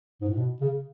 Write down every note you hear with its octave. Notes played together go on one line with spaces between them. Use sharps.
G#2
A2
B2
C#3